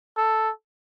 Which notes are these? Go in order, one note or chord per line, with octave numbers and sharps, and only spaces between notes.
A4